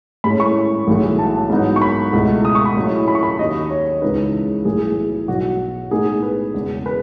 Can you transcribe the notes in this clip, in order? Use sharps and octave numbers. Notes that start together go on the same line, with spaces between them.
A2 G#3 C#4 E4 B5
C#6
B1 A2 E3 G#3
A5
G#2 F#3 B3 D#4
C#6
B5
C#2 B2 A3 E4
D#6
C#6
B5
A2 F#3 C#4 E4
B5
C#6
B5
D#2 D#3 F#3 D#5
C#5
C#2 C#3 E3 G#3 D#4 B4
B1 A2 E3 G#4
B1 B2 F#3 B3 F#4
A2 G#3 B3 D#4 G#4
B4
E1 E2 C#3
B4